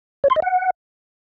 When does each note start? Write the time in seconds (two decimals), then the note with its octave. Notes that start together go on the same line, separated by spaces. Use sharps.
0.24 C#5
0.30 C6
0.36 D#5
0.42 F#5